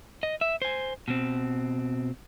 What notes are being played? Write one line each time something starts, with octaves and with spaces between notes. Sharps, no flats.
D#5
E5
C5 G#5
B2 C4